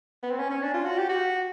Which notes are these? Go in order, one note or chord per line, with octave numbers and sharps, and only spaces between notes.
B3
C4
C#4
C#4
D4
F4
F#4
G4
F#4